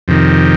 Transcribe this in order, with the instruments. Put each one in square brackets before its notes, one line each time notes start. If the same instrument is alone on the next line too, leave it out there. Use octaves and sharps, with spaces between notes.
[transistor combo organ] F2 C3 D#3